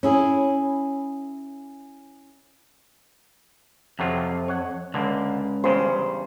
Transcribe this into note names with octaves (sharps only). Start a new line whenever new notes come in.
C#4 E4 G#4
F2 C3 F#3 F4
C#5 F#5
C#2 D3 A#3
E2 G2 C#3 C5